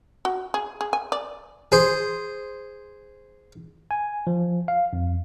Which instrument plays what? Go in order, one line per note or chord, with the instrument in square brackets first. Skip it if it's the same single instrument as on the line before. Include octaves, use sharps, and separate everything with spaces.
[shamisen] F#4
G#4
G#4
G#5
D5
[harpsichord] G#4 C5
[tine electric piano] G#5
F3
F5
F2